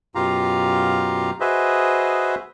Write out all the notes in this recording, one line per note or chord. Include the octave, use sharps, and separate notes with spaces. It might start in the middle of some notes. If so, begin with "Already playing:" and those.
F#2 B2 F4 G4 F5 A#5
F#4 G#4 B4 C5 D#5 E5